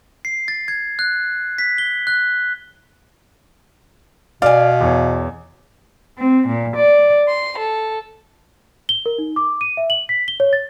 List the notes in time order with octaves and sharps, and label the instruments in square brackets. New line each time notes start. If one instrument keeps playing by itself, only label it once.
[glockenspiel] C7
A6
G#6
F#6
B6
G7
F#6
[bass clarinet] B2 [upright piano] D5 [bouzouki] F5 G#5
[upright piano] E2 C#5
[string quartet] C4
A#2
D5
C6
A4
[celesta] G7
A#4
D#4
D6
D#7
E5
F#7
B6
G7
C#5
A6